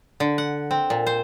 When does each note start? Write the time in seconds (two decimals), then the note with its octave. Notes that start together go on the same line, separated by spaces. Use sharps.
0.20 D3
0.38 F#5
0.71 C4
0.90 A#2
1.07 C5